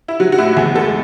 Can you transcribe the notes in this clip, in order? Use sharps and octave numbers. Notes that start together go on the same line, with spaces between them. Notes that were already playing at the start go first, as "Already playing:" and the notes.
E4
F#3 F#4
F#4
A2 E4
E2 G#4
G#3 A4